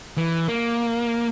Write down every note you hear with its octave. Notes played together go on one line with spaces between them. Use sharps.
E3
A#3